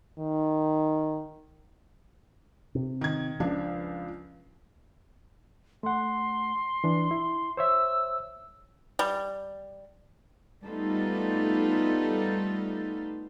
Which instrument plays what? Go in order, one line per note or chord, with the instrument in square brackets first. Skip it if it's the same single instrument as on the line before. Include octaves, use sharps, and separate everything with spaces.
[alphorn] D#3
[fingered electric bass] C3
[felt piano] D#3 G#6
[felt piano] C#2 D4 [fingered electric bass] F3
[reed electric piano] A3 F#5 [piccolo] C6
[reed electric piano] E3 D4
E4
[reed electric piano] C5 C#5 E5 [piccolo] E6
[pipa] G3
[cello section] G3 A3 B3 D#4 F4 A4